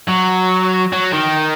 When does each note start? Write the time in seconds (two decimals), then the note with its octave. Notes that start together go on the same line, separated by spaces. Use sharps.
0.08 F#3
0.92 F#3
1.13 D#3